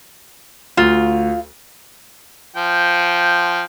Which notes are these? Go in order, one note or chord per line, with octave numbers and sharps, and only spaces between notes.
D2 F4
F3 G5